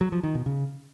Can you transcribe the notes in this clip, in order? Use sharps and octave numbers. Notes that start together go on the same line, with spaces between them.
F#3
F3
D#3
B2
C#3